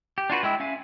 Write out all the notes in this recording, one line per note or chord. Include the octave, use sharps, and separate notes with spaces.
G4
D4 F4 F#4 B4
G#3 E4 G5 E6
C#4 E5 F5 G#5